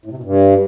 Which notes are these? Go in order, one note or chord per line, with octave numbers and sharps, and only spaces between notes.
A2
C3
B2
G2